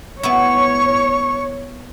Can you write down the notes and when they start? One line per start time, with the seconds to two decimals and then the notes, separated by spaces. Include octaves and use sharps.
0.23 B3 E4 C#5 C#6